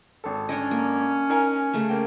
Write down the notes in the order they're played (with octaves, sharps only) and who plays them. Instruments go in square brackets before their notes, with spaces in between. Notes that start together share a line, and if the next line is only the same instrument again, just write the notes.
[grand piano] G#1 A4
[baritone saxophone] C#4 [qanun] D4 D5 D#5
[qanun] A#3
[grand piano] D#4 A#4 G#5
[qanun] C#3 A3
[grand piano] A#3 G5